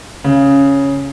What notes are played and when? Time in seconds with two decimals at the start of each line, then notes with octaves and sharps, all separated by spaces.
0.25 C#3